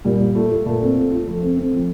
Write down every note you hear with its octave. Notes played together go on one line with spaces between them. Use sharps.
A#2 G3
A#2
A3 F4
F4
A#2 A3
C4
F4
F4
F3 A3
C4
C4
F3